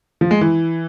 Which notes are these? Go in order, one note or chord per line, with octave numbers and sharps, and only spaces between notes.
F3
G#3
E3